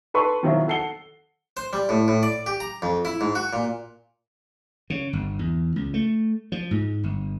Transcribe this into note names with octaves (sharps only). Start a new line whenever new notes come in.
A4 B4 C6 C#6
B2 D#3 F3 F#3 E4 F4
A4 F#5 C7 C#7 G7
C5
G3
A2
A2
D5
G4
A#5
F2
E4
G#2
F#4
A#2
C#3
G1
E2
C#2
A3
F3
G#2
G1